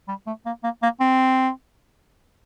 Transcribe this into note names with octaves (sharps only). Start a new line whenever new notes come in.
G3
A3
A#3
A#3
A#3
C4